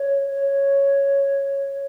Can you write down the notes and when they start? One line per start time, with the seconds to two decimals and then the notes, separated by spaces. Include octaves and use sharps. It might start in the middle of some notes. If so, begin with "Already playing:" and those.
Already playing: C#5
0.30 C#5